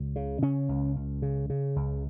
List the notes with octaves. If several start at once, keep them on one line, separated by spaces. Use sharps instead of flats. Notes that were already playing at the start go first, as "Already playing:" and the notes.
Already playing: C#2
C#3
C#3 C#4
C#2
C#2
C#3
C#3
C#2